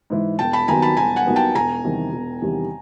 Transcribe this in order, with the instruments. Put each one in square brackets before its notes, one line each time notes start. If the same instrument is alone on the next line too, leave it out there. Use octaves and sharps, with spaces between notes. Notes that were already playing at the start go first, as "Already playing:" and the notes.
[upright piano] G#2 E3
[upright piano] E1 [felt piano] G5 A5
[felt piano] A5 B5
[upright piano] D#2 D#3 F#3 B3 [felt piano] G#5 A#5
[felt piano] A5 B5
[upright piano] E1 [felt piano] G#5 A#5
[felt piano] F#5 G#5
[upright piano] D#2 D#3 F#3 B3
[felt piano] G5 A5
[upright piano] E1 [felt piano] G#5 A#5
[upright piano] E2 C3 D#3 G3
E1
E2 C3 D#3 G3